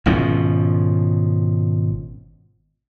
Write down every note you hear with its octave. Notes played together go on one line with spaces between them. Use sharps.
G#1 B2 F3 C#4